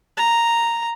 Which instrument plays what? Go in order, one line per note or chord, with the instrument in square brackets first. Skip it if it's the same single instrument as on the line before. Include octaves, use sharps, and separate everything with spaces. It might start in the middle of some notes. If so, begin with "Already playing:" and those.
[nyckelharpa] A#5